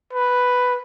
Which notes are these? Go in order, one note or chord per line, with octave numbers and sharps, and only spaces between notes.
B4